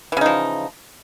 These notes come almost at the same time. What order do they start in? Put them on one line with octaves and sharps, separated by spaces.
E3 C#3 D#4 F3